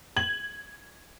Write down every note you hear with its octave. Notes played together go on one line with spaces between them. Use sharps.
G#6 F#7